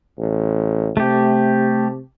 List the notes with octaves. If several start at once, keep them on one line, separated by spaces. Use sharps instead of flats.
A1
C3 A3 G4